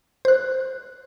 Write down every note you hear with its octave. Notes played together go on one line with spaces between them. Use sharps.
C5 F#6